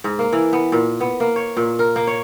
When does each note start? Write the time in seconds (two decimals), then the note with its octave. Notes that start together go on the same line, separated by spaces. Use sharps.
0.04 G#2
0.19 A#3
0.33 E3
0.53 B3
0.72 A#2
1.00 B3
1.20 A#3
1.36 C#5
1.57 A#2
1.79 A#4
1.96 A#3
2.07 C#5